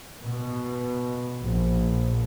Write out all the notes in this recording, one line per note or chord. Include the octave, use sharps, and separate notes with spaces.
B2
A#1